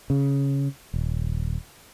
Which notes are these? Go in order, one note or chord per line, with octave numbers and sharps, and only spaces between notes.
C#3
D#1